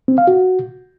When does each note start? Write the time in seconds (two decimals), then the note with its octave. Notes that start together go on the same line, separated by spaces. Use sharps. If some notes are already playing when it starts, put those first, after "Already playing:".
0.08 C4
0.18 F5
0.27 F#4